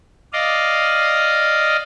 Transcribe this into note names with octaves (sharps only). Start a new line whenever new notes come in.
D5 D#5 F5